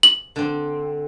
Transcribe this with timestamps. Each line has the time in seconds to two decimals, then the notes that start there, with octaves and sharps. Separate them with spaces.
0.03 F#7
0.36 D3 C4